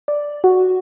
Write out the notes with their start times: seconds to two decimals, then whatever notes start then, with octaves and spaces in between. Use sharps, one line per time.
0.08 D5
0.44 F#4